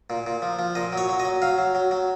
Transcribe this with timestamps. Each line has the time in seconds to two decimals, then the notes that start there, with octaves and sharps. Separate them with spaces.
0.10 A#2
0.26 A#2
0.42 F3
0.59 F3
0.75 A#2 D#5
0.92 F#3
0.98 C#5
1.09 F#3
1.20 D#5
1.25 F#3
1.42 F#3 F5
1.58 F#3
1.75 F#3
1.91 F#3